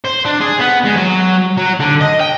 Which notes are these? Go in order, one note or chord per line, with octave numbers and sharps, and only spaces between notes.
C5
D4
G#4
B3
G#3
F#3
F#3
D3
D#5
G5